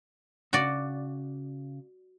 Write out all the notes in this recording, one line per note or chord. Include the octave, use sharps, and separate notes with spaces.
C#3 F#4 D5